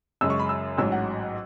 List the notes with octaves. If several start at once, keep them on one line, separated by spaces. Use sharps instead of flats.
F#2 C#3 G#3 E6
C#6
B5
E6
A1 G#2 F#3 E6
F#5